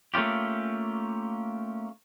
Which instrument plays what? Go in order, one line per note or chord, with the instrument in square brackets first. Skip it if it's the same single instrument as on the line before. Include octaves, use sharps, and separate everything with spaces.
[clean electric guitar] A3 A#3 C#4 F4 G4